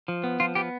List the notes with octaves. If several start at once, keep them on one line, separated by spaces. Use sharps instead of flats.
F3
B3
F3 F4
B3 G4